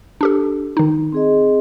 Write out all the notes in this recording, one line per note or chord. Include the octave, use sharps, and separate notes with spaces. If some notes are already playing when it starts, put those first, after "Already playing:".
D4 G4 A4
D#3 D#4
C4 G#4 D#5